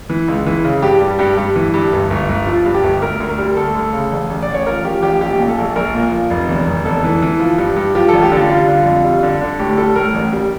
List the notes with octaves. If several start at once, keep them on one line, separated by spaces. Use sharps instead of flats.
E3
C#2
E3
C#3
G2 G4
G3
G2 G4
G2
E3
G2
G1
G1
G1
F3 F4
G2
G4
G1
D2 A#4
D2
A#4
G3
D2 A4
D2
C#3
A1
A1
D5
A1
C#5
F3 A#4
F3 G4
A1 G4
A#1 G4
A#2
A4
A#1
A#1 A#4
A#2
F3
F1
E2
F1
E2 A4
E3
E3
F3
G2
G2
F3 G4
A1 A4
G4
D3 F4
G3 F4
D3
F2
G3
D3
D3
A2 G4
G3 A4
A2 A#4
A1
G3